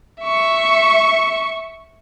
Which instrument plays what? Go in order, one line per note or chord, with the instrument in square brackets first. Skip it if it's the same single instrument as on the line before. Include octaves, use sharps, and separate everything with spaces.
[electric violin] E5 C#6